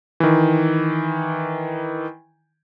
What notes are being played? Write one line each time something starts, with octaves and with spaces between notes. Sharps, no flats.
D#3 E3